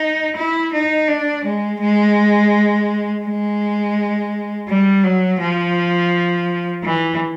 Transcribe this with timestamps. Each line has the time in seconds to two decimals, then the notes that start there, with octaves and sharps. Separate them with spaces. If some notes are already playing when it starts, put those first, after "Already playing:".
Already playing: D#4
0.36 E4
0.73 D#4
1.08 D4
1.44 G#3
1.80 G#3
3.25 G#3
4.68 G3
5.04 F#3
5.40 F3
6.84 E3